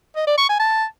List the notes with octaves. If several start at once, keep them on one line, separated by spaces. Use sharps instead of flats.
D#5
D5
C#6
G#5
A5